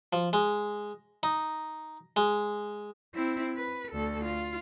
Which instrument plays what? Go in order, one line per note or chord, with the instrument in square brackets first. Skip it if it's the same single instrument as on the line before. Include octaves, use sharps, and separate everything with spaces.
[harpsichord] F3
G#3
D#4
G#3
[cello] C4 E4
B4
D2 A4
F4